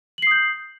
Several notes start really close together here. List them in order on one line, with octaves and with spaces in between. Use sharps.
F#7 C7 D#6 G6